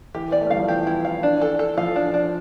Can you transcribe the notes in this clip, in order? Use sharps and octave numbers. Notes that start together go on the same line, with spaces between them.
E3 G4
B3 D5
A3
G3 F5
F3
E3 G4
E4
F5
D4
A4
A4
F3 F5
D4
D4